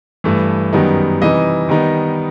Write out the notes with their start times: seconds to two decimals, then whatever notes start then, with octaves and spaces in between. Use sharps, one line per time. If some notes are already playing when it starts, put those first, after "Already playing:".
0.24 G2 E3 A3
0.73 F#2 D#3 G3 B3 D#4
1.21 C3 E3 G3 D#4 D#5
1.69 D#3 G3 B3 D#4